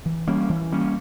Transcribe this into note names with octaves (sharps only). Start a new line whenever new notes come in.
E3
G3 A#3 C#4
E3
G3 A#3 C#4